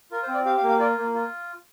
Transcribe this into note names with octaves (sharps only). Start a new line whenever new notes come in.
F4 A#4
C5
C4
D5
G4 F5
F5
A#3
F5
F4 D5
A#3
F4